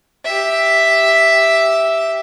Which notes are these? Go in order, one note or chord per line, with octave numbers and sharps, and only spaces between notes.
G4 E5